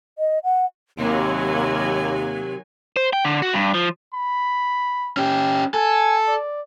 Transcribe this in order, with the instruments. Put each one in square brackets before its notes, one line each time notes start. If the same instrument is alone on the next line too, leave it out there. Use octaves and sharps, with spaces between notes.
[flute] D#5
F#5
[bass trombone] D#2 [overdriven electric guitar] C3 [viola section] D#3 F#3 G#5 [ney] A#3
[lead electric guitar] C5
G5
D3
F#4
G2
F3
[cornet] B5
[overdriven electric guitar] C#4 G4
[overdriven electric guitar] A4 [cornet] G#5
[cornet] D5